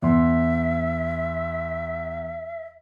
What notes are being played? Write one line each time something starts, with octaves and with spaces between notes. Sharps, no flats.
E2 E5 C6